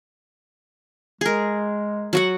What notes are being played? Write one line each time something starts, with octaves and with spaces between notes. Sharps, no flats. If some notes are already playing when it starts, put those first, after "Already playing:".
G#3 G#4 A#4
F#3 F#4 F#5